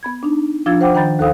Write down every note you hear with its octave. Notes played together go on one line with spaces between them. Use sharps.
B3 B5 G#6
D4 D#4
F3 D4 F4 E6 G#6 A6
C5 F#5 G5 D6 E6
D#3 G5 A#5 B5 G6 A6
D#2 A4 C5 F5 D#6 E6